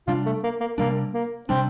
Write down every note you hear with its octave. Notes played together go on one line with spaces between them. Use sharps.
C3 G3 D4 F4
A3
A#3
A#3
C3 G3 A#3 D4
A#3
C3 G3 C4 D4